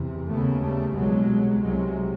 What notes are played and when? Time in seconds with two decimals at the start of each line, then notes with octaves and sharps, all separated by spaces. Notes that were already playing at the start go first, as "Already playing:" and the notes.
Already playing: E2 C3
0.28 D#2 C#3 A3 B3
0.61 G3 A3
0.94 C2 B2 F#3 G#3
1.61 C2 C3 F#3 G#3